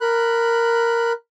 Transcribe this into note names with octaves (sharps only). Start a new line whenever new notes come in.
A#4 B5 F#6